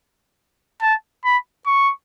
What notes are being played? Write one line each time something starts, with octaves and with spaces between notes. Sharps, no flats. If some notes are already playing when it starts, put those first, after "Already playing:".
A5
B5
C#6